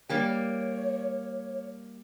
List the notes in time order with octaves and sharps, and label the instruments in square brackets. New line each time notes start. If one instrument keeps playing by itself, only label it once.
[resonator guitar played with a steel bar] G3 A#3 G4 [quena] C#5